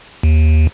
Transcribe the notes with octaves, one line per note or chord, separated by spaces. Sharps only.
D#2